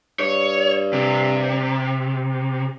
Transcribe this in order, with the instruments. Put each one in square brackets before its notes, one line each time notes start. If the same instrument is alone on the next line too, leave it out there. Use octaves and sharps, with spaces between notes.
[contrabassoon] G2 [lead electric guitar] C#5
[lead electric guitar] C3